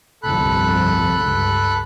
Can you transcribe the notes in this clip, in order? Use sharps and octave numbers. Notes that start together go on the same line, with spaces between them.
G1 C2 F2 A4 B5 F#6
C#2 G2